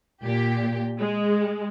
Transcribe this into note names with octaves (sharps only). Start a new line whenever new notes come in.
A#2 G4
G#3